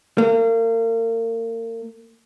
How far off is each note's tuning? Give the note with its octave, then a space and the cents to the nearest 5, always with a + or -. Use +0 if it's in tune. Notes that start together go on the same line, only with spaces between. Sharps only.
A#3 -35